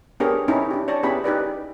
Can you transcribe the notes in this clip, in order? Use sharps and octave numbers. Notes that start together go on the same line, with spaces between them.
B3 D4 G4 G#4 A#4 C#5
C4 C#4 D#4 E4
D4 G4
C#5 D5 A5
B3 C#4 E4 G4 G#4 B5
D#4 G4 B4 D5